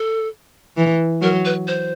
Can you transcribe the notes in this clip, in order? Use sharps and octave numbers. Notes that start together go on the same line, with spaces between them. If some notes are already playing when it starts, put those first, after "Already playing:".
Already playing: A4
E3
F#3 A#4
B4
C5